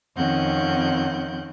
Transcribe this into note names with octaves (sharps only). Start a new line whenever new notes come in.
F2 D#3 C4 C#4 F#5 G6